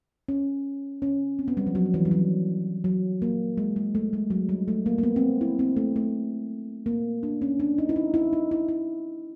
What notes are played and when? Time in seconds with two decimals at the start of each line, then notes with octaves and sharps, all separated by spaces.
0.28 C#4
1.02 C#4
1.39 C4
1.48 B3
1.57 G3
1.67 F3
1.75 F#3
1.85 F3
1.94 E3
2.05 G3
2.11 F#3
2.84 F#3
3.22 A#3
3.57 G#3
3.76 G#3
3.95 A3
4.13 G#3
4.30 F#3
4.49 G3
4.68 A3
4.86 A#3
4.98 A#3
5.03 B3
5.16 C4
5.41 E4
5.59 C4
5.76 A3
5.96 A3
6.86 A#3
7.23 D4
7.42 C#4
7.60 D4
7.78 D#4
7.89 E4
7.96 D#4
8.14 E4
8.33 D#4
8.51 E4
8.68 E4